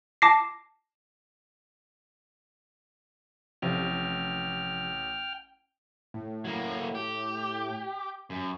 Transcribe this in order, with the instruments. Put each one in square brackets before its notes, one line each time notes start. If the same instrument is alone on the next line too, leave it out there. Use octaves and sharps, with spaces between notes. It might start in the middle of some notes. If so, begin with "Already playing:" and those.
[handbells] A5 D6 A#6 C7
[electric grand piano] A1 [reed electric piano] A2 C3 F3 [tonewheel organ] G5 F6
[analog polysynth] A2
[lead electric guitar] F#3 A#3
G4
F#2